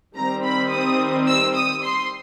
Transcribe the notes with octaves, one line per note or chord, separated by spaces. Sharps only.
D#3 G3 C4 A#5
B5
D#6
E6
D#6
C6